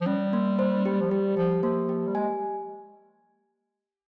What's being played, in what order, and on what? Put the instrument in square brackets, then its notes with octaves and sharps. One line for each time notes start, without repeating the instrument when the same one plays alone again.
[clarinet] F3
[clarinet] G3 [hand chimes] C#4
[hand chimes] A#3
C5
G4
[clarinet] F3
[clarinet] G3 [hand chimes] G4
[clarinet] F3 [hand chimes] G4
[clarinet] F3 [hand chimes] A#3
[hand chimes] G4
[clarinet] G3
[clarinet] G#3 [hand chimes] G#5